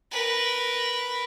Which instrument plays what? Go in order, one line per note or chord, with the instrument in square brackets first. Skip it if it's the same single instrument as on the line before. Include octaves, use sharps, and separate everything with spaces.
[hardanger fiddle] A#4 B4